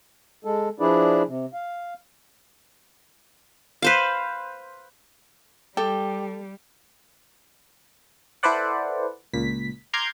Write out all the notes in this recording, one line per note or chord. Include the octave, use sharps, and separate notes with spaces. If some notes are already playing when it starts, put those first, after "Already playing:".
G#3 A4
F3 D4 E4 G#4 B4 D5
C3
F5
B4 C5 F5
G3 G4 A4
E4 A4 B4 C5 D5 F#5
C#2 A#2 B6
A#5 C6 D6 F6 G6 G#6